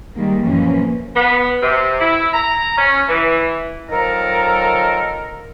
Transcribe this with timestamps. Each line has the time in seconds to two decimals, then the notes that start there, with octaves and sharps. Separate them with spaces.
0.14 D#3 G3 G#3 A#3
0.42 F#2 A#2 E3 F3 A#3 C#4
1.15 B3
1.62 C3
2.00 E4
2.34 A#5
2.78 C#4
3.08 E3
3.90 D#3 F3 F#3 A4 A#4